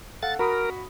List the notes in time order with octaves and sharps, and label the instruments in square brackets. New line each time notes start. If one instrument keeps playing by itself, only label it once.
[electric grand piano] A4 F5 F#5 [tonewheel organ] A6
[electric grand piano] F#4 B5 D#6 [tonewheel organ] A#4